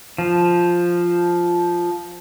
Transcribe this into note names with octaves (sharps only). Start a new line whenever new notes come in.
F3